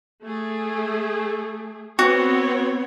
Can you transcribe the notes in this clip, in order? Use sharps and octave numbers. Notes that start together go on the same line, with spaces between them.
A3 G#4
B3 C4 F#4 C#5